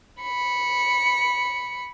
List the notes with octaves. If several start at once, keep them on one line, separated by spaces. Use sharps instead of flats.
B5 C#7